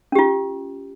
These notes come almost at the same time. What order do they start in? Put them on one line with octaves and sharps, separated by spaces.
C#4 G4 F4